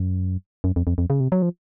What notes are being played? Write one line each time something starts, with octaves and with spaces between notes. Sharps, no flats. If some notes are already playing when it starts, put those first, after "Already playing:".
Already playing: F#2
F#2
F2
F2
F2
C#3
C3
F#3
F3